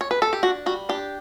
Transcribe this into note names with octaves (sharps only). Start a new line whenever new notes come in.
C#5
B4
A4
G4
D4 F#4
G3 F#4
D4 G4